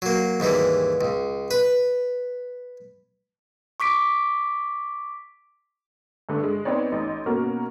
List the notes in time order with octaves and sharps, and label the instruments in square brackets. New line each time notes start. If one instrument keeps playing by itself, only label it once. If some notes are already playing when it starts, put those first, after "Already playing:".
[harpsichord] F#3 A#3
D#2 G#2 E3 G3
C#2
B4
[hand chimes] C#6 D6 B6 D7
[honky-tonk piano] G2 D3 A3
G#3
B3 C4 D#4 C#5 D5
A1 D#4
B2 A#3 C#4 F#4 A#4